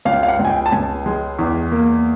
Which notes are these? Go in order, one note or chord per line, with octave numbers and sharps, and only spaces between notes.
C#2 F5
F5
F#5
C#2
G#5
G5
A5
C#2 G#5
G#3
E2
A#3